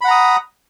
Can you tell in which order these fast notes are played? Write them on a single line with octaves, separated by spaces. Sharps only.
B5 F#5 A#5 D#6